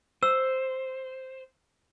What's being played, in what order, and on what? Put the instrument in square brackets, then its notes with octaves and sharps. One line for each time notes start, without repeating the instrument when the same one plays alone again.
[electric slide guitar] C5 [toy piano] E6